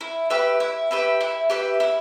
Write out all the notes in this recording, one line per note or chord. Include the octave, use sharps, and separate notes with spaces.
E4
G4 B4 E5
E4
G4 B4 E5
E4
G4 B4 E5
E4